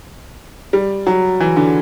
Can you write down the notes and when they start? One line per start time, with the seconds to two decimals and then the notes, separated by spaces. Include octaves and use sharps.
0.73 G3
1.07 F#3
1.40 E3
1.56 D3